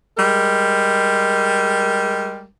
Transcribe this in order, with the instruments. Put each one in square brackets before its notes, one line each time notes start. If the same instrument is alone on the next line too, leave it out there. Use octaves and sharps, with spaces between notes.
[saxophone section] G3 G#3 A#4